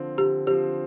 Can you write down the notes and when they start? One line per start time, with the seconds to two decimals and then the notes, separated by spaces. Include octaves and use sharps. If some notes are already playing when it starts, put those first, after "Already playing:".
Already playing: D3 F3 C4
0.18 D3 G4
0.47 F3 C4 G4